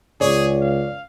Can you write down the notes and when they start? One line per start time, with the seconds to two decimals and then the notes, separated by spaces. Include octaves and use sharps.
0.21 C#2 G#4 C#5 D5
0.61 F5